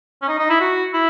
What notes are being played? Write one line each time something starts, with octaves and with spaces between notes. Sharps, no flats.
C#4
D#4
D#4
E4
F#4
E4